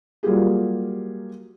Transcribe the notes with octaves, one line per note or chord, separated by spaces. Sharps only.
F#3 G3 A#3 F4 G4 G#4